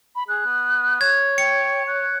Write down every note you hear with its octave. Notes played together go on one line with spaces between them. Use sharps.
B5
G#4 F#6
B3
C#5 G#6
G5 C#7
F#6